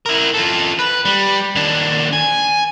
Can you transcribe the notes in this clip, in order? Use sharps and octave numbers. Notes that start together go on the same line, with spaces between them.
E4 A#4
F4 A4
B4
G3
D#2 D4
G#5